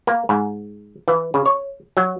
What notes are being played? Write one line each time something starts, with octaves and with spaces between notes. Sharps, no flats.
A#3
G#2
E3
C#3
C#5
F#3